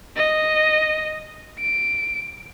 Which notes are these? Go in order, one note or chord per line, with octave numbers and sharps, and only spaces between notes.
D#5
D7